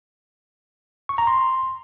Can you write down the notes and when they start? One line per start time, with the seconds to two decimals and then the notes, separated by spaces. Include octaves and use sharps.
1.09 C#6
1.18 A#5
1.27 C6